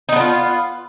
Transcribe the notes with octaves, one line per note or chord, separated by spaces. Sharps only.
B3 D4 D#4 F4